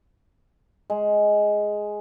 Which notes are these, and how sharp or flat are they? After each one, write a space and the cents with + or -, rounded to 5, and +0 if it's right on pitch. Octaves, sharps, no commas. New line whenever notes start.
G#3 +5